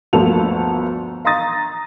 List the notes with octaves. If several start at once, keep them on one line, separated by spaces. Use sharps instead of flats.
G1 D2 F3 A#3 A4 F7
F5 A#5 C6 D#6 A6 A#6